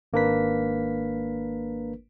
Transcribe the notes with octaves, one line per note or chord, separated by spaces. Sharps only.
G#1 A#3 D4 A#4 B4 B6